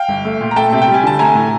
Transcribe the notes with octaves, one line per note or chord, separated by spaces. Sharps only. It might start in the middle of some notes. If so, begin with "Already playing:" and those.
Already playing: F5 G5
G1
A3
A#2
A#5
A3 G5 A5
C3
G5
G3
G#5
D3 A5
A3 G#5 A#5
A2